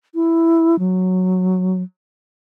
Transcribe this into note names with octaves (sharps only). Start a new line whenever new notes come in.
E4
F#3